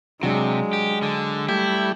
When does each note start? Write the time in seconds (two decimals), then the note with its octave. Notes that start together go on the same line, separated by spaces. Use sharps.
0.23 C3 F#3 G#3 D4
0.73 G4
1.03 D3
1.49 G3 A3 E4 G4